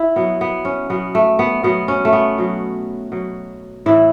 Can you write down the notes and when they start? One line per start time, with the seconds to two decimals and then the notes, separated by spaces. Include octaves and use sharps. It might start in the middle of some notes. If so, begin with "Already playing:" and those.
Already playing: E4
0.16 B2 F#3 B3
0.41 B3
0.65 C#4
0.90 B2 F#3 B3
1.15 A3
1.39 B3
1.63 B2 F#3 B3
1.88 C#4
2.05 A3
2.13 B3
2.38 B2 F#3
3.12 B2 F#3
3.86 A2 E3 E4